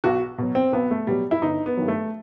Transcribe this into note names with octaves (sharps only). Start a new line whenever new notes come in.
B1 F#4
B2 F#3
C4
B1 B3
A3
B2 F#3 G3
E4
G1 D#4
B3
G2 D#3 F#3
A3